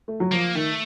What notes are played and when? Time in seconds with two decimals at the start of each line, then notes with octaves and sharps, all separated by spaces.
0.08 A3
0.20 F#3
0.31 F3 A#3
0.55 D#3 A3